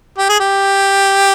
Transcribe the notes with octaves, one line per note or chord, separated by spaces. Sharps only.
G4
G#4
G4